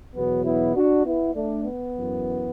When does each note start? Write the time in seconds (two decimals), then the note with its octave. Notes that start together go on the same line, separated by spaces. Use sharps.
0.15 E2 B2 F#3 B3
0.45 B3 E4
0.75 D4 F#4
1.05 B3 E4
1.35 A3 D4
1.64 B3
1.94 F#2
1.99 E3